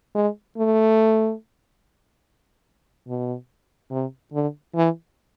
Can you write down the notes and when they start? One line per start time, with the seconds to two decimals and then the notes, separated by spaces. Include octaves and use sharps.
0.15 G#3
0.57 A3
3.08 B2
3.91 C3
4.33 D3
4.75 E3